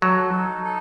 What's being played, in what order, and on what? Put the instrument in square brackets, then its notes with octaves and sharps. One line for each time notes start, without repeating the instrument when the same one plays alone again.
[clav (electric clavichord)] F#3 [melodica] A4
[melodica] D#4
A4